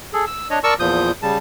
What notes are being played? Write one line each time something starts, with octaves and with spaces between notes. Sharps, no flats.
G#4 A4
E6
D4 C#5 D#5
A#4 D5 A5 C#6 E6
E2 A#2 F3 D#6 G6
C#3 G3 A5